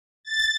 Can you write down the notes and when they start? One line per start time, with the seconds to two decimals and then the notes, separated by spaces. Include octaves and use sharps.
0.24 A6